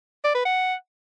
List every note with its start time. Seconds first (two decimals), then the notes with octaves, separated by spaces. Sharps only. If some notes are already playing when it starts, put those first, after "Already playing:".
0.24 D5
0.35 B4
0.45 F#5